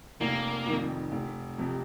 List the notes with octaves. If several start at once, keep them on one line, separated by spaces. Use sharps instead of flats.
F1 A#3
F2 D#3
F1
F2 C3